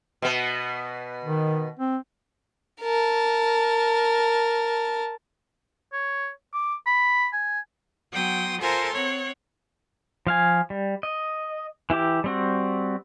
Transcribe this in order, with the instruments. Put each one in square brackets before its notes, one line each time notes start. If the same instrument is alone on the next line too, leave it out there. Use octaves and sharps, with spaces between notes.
[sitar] B2 B3
[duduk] D#3
C4
[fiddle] A#4 A5
[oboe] C#5
D6
B5
G#5
[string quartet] F#3 B3 G5 C6 D#6
F4 A4 A#4 C5 G#5 C6
C4 C#5 F#5
[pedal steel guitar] F3 F5 G#5
G3
D#5
E3 E4 G4 D6
G3 C4 F#4